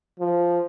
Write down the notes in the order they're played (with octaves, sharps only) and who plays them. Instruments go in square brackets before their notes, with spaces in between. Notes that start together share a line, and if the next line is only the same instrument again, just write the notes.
[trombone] F3